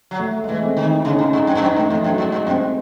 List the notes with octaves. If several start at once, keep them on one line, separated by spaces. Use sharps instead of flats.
F#3
A3
G#3
E3 A3
C4
D#3 D#4
E4
C#3 D#4
C#4
A2
D#4
G#2
F#2
G#2
F#2 D#4
F#2 A3
E2 A3
F#2 F#3
G#2 G#3
G#2
F#2 C4